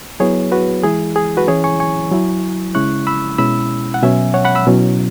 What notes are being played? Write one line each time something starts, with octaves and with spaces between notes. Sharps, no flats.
F#3 B3 E4 G#4 C#5
F#4 B4
E3 G#3 E4 G#4
G#4
F#4 B4
E3 C#4 E4 G#4 C#5
G#5 C#6
G#5 C#6
F#3 E4
C#3 G#3 C#4 E4 C#6 F#6
B5 E6
B2 G#3 C#4 E4 B5 E6
F#5
B2 F#3 C#4 E5 G#5
C#5 F#5
F#5 B5
B5 E6
B2 F#3 C#4 E4